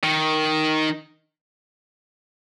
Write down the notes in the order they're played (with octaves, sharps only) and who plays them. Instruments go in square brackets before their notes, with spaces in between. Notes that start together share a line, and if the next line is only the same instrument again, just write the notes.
[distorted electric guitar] D#3